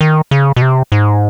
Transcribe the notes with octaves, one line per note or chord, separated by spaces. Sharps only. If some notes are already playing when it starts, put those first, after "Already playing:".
D#3
C#3
B2
C3
G#2